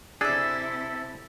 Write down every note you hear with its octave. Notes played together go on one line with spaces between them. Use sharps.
C3 D4 E4 G#4 A4 E5